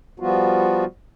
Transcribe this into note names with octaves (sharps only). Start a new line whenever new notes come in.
F3 G3 B3 F4 F#4